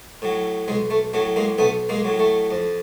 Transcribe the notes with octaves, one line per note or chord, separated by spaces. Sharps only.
A2 F#3
B1 G#3
A3
A2 F#3 A3
G#3 A#3
B1 A3 B3
G#3 A#3
A2 F#3
A3
F2